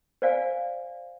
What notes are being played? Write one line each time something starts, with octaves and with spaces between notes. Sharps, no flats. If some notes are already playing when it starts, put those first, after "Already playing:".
C5 D5 F5 G#5